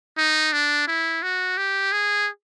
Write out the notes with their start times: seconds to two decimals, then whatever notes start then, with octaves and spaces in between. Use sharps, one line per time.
0.18 D#4
0.53 D4
0.88 E4
1.23 F#4
1.58 G4
1.92 G#4